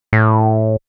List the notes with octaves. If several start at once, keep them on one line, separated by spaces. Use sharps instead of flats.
A2